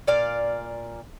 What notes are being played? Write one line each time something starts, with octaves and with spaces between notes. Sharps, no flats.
A#2 D5 F5